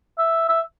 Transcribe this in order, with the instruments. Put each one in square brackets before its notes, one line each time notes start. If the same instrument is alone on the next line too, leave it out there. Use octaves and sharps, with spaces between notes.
[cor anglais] E5
E5